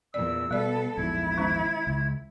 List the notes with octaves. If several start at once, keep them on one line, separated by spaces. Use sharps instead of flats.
E2 A#2 D5 E6
B2 G3 B3 A4 D5
A#1 E2 G#2 E4 G#6
D#3 G#3 C#4
C#2